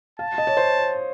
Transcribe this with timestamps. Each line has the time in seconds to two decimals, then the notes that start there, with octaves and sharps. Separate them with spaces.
0.19 F5 A5
0.38 D#5
0.47 C#5
0.57 C5